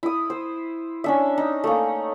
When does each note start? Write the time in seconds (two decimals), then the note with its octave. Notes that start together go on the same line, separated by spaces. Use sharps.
0.03 E4 D#6
0.30 C5
1.04 C#4 D4 E5
1.38 D#4
1.64 A3 A#3